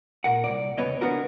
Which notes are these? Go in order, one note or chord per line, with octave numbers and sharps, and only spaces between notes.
A#2 A#4 F#5
C2 B2 D5
E2 C#3 B3 C#5 D#5
B3 D4 F4 F#4 A#4